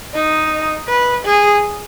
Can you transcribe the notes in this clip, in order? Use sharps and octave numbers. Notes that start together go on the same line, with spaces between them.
D#4
B4
G#4